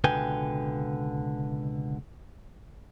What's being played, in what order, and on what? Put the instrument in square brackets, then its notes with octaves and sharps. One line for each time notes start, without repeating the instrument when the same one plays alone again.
[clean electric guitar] C#2 B2 D3 B4 G5 G#5